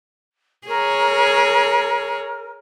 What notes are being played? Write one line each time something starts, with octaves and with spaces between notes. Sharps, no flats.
G#4 A#4 C#5